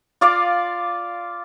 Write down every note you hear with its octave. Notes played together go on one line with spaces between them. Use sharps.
F4 D5 F5 D6